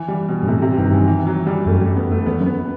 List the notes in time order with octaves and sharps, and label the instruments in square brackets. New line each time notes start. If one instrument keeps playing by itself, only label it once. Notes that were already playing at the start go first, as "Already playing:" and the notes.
Already playing: [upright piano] E3
G3
B2
[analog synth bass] G2
[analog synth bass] A2 [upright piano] C3
[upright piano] C3
[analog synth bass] G2 [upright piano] D#3
[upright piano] E3
E3
F#3
G3
[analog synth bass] F#2 [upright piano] A3
[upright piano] G3
B3
A3
[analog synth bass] E2 [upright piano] B3
[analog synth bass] F#2
[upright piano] B3